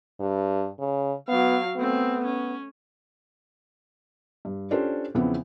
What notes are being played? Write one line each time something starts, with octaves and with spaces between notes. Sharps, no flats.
G2
C#3
F#3 B3 F5
A3 B3 C4
C#4
G2
C#4 D4 F4 G4 A4 C5
E2 C#3 E3 F3 B3 C4